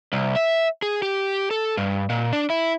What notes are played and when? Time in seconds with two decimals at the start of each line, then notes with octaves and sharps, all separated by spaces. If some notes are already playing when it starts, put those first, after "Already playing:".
0.13 C2
0.36 E5
0.82 G#4
1.02 G4
1.51 A4
1.77 G2
2.10 A#2
2.33 D4
2.50 E4